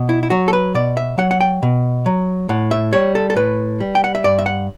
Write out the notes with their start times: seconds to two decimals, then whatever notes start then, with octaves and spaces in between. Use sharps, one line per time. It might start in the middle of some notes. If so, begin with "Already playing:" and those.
Already playing: B2
0.09 E4
0.23 E4
0.30 F#3 F#4
0.48 A4
0.53 B4
0.75 B2 D5
0.97 E5
1.18 F#3 F#5
1.31 F#5
1.41 G5
1.63 B2
2.06 F#3
2.49 A2 F#5
2.71 E5
2.93 G3 C#5
3.15 A4
3.30 A4
3.36 A2 B4
3.80 G3
3.95 G5
4.04 F#5
4.15 E5
4.24 G2 D5
4.39 E5
4.46 F#5